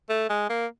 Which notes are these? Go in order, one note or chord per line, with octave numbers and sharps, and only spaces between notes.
A3
G#3
A#3